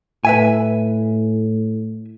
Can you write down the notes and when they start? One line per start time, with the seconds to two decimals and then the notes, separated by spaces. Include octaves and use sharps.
0.25 A2 B4 E5 G#5